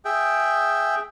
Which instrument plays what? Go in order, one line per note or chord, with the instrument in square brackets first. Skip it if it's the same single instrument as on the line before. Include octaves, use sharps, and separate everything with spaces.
[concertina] G#4 E5 G5